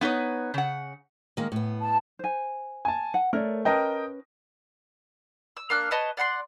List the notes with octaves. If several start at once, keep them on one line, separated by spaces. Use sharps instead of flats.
B3 D#4 B4 C#5
C#3 F#5
D#3 G#3 A#3
A2 B3
A5
C5 G#5
G#5 A5
F#5
A3 A#4 C#5 D5
C#4 A#4 B4 D#5 G5 A5
E6
A#3 D4 F6 F#6
B4 C#5 D#5 A5
D5 F#5 A#5 C6